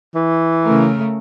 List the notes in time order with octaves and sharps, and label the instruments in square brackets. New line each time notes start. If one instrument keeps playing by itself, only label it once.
[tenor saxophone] E3
[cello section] C#3 A3 A#4